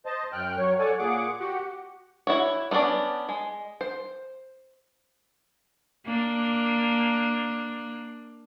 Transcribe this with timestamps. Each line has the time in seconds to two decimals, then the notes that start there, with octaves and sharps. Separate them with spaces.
0.06 C5 D#5 A5
0.33 F#2 G5 F6 F#6
0.58 F#3 C#5
0.79 A4 C#5 D5 F#5 G#5
0.98 A#2 G#4 F#5 D6
1.40 F#4 G4 F#5
2.27 E4 F#4 C#5
2.71 A3 B3 C#4 D4 D5
3.29 G#3
3.81 C5
6.06 A#3 D4